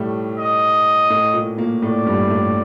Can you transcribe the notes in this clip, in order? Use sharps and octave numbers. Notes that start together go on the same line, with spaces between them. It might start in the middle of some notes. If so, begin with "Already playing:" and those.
Already playing: A2 G3 A3
D#5
A2 A3
A#2 A#3
A#2 A#3
A2 A3 D5
G2 G3
A2 A3